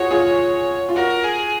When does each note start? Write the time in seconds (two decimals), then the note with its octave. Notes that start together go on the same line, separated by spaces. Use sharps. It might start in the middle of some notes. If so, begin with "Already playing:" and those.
Already playing: F4 F#4 G#4 C#5
0.11 F4 G#4
0.89 F4
0.96 F#4 A#4
1.24 G#4